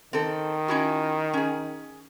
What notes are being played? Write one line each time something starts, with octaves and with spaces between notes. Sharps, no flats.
D#3 C4 A4
C#4 E4 F#4
C#4 G#4